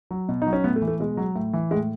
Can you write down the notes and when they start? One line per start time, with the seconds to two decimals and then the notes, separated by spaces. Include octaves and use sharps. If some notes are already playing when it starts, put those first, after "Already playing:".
0.11 F#3
0.29 B2
0.42 F#3 D#4
0.53 C#4
0.64 A2 B3
0.76 A3
0.82 E3
0.88 A3
1.00 B2 G#3
1.17 F#3
1.36 A2
1.53 E3
1.71 A2 G#3